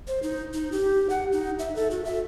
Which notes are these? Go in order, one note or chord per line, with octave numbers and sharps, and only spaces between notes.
C5
D#4
D#4
G4
F#5
D#4
E5
A4
F#4
E5